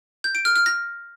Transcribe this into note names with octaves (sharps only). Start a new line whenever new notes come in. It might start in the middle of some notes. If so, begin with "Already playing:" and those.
G6
D7
F6
F6
A#6